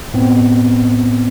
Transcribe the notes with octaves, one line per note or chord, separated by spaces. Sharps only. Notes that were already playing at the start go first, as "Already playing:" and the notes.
A2 B3 C4